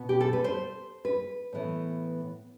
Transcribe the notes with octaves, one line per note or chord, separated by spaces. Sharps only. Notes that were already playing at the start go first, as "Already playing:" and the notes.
Already playing: B2 B3
G4
A4
B4
C5
B4
A2 E3 B3